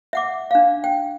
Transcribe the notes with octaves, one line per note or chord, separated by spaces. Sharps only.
E5 F#5 D6
D4 F5
G5